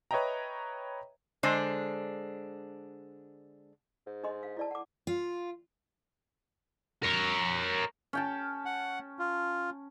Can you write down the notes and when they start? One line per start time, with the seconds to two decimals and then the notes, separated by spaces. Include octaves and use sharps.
0.11 B4 C#5 D#5 E5 G5 A#5
1.43 D3 G#3 D4 C5
4.06 G#2
4.23 D4 D#5 C6
4.43 F5
4.57 E4 D5 A5
4.71 F#5 D6
5.07 F4
7.03 A#4 C#5
8.13 C#4 G5 A5
8.65 F#5
9.19 F4